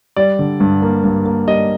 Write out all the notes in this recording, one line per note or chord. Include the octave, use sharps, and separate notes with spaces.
G3 D5
D3
G2
A#3
G2
A#3
G3 D#5